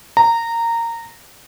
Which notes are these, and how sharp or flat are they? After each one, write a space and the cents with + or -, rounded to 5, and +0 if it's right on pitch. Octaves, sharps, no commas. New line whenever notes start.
A#5 -15